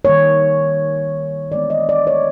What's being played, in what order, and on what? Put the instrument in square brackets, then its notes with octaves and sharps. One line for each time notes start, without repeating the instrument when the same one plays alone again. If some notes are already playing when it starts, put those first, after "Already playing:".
[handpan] D#3 G3 A#3 C#5
E3 G#3 B3 D5
D#5
D5
C#5